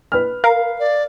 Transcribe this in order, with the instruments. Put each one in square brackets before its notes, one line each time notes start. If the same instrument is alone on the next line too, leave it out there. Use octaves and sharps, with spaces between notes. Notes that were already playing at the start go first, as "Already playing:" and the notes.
[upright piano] B4 F6
[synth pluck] A#4 [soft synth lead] F5
[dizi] D5